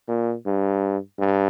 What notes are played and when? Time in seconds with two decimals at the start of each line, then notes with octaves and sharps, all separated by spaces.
0.08 A#2
0.46 G2
1.19 G2